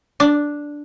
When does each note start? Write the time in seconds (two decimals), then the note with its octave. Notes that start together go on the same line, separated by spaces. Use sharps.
0.20 D4